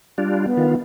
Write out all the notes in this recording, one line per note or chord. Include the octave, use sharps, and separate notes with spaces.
G3 D4 F4
B3
D#3 F4